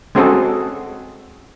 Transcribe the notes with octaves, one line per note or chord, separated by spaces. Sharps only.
G#3 C4 C#4 F#4 G#4 A4